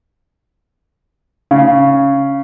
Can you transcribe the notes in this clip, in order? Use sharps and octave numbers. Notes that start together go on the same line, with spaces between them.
C#3